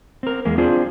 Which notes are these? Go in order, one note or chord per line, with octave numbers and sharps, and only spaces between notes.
C4 A#4
E2 G#3 A#3
C4 D4 F4 G#4 C5